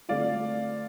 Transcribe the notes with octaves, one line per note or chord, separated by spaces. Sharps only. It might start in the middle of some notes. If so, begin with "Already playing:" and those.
D3 A3 C4 F4 D5 F5